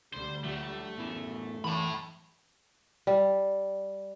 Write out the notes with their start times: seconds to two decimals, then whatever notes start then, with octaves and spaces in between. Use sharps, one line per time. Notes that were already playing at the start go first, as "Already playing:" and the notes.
0.14 D2 D3 G3 C5
0.44 F#3 A3 F4 G4
0.98 F#2 A2 B3 E4
1.65 E3 A5 B5
3.07 G3